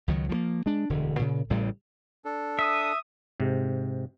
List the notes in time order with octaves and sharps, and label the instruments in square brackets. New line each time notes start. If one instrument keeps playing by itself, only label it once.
[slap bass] C#2 D#3 F#3
F3 G3 A#3
G#3 D4
E1 D2 D3
A#2 C#3
A1 A2 C#3 G3
[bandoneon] D4 A4
[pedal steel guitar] E5 [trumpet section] D#6
[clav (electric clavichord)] G#2 C3